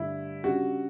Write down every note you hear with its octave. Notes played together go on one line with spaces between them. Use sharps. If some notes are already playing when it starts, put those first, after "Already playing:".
Already playing: G2 D3 A3 E4
C#3 G3 D4 F#4 G4